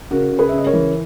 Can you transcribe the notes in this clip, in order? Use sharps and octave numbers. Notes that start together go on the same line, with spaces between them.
C#3 F#4 A#4
C#3
G#4 B4
E5
C#3
D#5
A#4 C#5
E3